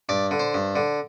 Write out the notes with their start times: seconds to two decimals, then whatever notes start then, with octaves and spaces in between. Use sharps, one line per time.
0.09 G2 D5
0.31 D3
0.39 C5
0.54 G2
0.76 D3